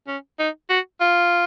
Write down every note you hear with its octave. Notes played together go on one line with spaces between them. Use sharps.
C#4
D#4
F#4
F4